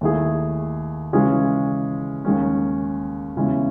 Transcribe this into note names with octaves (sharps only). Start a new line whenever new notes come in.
D#2 D#3 A3 E4 G#4
C#3 E3 G#3 C#4 G#4
D#2 D#3 G#3 C#4
E2 C#3 G#3 C#4 E4